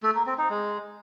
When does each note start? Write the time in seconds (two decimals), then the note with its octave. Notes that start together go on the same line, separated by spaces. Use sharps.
0.03 A3
0.15 A#3
0.27 C4
0.38 D#4
0.50 G#3